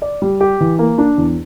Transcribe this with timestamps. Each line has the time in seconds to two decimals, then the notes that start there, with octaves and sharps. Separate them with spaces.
0.02 D5
0.22 G3
0.40 G4
0.61 E3
0.79 A#3
0.98 D4
1.18 E2